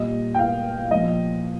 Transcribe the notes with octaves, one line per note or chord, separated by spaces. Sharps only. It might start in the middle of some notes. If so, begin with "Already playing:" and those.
Already playing: A#2 G3 D#5
G5
F5
A#2 F3 D#5